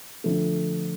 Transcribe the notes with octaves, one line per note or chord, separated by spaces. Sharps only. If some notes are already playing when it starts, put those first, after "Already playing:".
D3 F3 A3